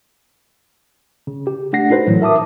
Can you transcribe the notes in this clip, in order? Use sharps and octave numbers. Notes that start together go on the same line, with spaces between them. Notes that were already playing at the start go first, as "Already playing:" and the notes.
C#3
G4
A3 D4 F#5 A#6 C7
D#4 F#4 A4 B4 C5
A2 E3 F#3
A#4 E5 A5 D6 D#6